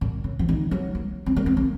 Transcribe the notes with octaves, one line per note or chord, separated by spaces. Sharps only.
A#2
C#3
F3
D#3
F#3
A#3
C4
A#3
C4
A#3